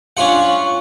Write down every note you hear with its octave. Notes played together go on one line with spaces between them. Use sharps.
C#4 D4 F4 F#5